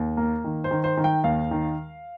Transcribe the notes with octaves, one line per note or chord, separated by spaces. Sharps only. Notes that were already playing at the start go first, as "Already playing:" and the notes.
Already playing: D#2
A#3
D#3
C5
D#3
C5
D#3
G5
D#2 F5
D#3